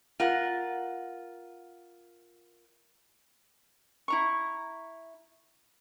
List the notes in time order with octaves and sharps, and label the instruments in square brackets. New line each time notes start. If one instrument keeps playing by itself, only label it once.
[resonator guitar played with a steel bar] F4 A#4 F#5
[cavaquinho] E4 A#5 C#6